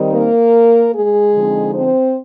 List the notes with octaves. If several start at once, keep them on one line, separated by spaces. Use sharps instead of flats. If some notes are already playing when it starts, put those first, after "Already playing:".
Already playing: D#3 G3 C4 D#4
A#3 A#4
G#3 G#4
D3 F3 C4 D#4
C4 C5